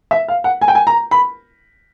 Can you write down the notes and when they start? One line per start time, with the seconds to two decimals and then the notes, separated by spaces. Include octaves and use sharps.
0.11 E5
0.28 F5
0.44 F#5
0.61 G#5
0.68 G5
0.75 G#5
0.87 A#5
1.11 B5